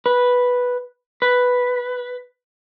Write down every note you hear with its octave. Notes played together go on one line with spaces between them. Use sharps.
B4
B4